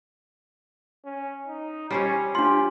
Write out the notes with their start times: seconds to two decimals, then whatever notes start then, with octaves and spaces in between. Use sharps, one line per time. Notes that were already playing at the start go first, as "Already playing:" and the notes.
1.05 C#4
1.48 D#4
1.91 G3 C#4 C5 C#5
2.35 D4 F4 G4 C6